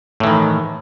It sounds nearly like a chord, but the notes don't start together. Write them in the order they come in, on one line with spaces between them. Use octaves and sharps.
A2 E3 D#3